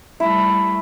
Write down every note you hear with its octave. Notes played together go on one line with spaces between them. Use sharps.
G3 A3 E4